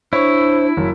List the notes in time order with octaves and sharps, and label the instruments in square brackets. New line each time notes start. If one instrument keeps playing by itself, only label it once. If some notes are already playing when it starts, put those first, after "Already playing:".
[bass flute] D4 [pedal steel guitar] E4 [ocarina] C5 [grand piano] C#5 C#6
[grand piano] F#1 [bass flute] F#3